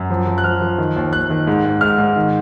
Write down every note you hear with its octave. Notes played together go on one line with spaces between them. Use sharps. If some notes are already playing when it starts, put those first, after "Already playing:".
Already playing: F#2
F3
F3
F#6
F3 F6
F3
D#3
D#2
D#2 F#6
D#3
G#2
G#2
G#2 F6
G#2
D#3